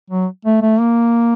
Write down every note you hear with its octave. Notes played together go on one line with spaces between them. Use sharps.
F#3
A3
A3
A#3